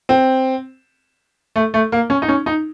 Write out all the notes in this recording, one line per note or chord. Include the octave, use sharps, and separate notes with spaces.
C4
A3
A3
A#3
C#4
D#4
C#4
D#4